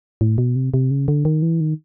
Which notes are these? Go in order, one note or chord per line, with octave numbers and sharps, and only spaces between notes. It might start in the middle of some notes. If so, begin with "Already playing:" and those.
A2
B2
C3
C3
C#3
D3
D#3
E3
D#3